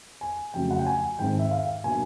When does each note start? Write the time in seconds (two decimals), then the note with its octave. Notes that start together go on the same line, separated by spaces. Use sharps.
0.21 G#5
0.54 F2 C#3 F#3 A3 G5
0.71 F#5
0.79 G5
0.86 G#5
1.19 G#2 D#3 G#3 C4 D#4 G5
1.39 E5
1.51 F5
1.84 B2 F#3 A#3 D4 G#5